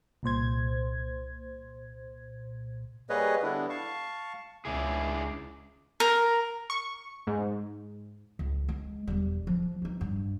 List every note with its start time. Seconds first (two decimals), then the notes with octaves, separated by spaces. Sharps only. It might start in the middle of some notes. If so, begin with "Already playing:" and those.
0.23 C2 A#2 C5 G#6
3.10 G3 A#3 G#4 B4 C#5 D#5
3.42 D3 G3 B3 D4 E4
3.70 F5 A5 C#6
4.65 C#2 D4 E4 G#4
6.00 A#4
6.70 C#6
7.27 G#2
8.39 C#2
8.69 G#3
9.07 E1 G3
9.47 F3
9.82 C4 D#4
10.01 G2